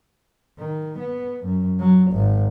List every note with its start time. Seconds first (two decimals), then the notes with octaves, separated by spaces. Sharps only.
0.58 D#3
0.99 B3
1.44 F#2
1.80 F#3
2.11 G#1